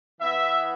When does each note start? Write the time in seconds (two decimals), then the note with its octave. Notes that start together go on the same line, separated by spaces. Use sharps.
0.19 E3 B3 E4 E5